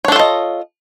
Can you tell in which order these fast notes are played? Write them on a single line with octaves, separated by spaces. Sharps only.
C#5 D4 A4 F4 D#5